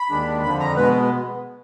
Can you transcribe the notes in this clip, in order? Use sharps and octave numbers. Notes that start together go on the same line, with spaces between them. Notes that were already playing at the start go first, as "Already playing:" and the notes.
Already playing: B5
D#2 D#3 G#3 D4
F2 D3 F3 B5
A#5
B2 G#3 B3 B4